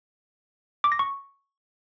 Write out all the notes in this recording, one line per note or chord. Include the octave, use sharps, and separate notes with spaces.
D6
A#6
C#6